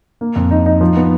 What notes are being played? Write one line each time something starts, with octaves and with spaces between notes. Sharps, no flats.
A#3
F2
D#4
D#4
F3
B3